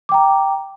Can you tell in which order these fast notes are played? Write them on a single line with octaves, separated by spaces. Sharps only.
D6 G5 A#5